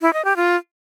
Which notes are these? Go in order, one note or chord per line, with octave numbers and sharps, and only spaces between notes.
E4
D#5
G4
F4